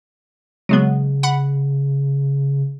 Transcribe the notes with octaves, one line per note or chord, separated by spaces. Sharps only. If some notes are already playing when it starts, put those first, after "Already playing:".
C#3 F#3 G#3 B3
F#5 B5